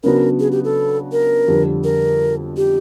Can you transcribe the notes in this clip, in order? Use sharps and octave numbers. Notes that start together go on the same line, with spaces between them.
C#3 F#3 B3 D4 F#4 A#4
G#4
G4
A4
A#4
F2 D3 G3
A#4
G4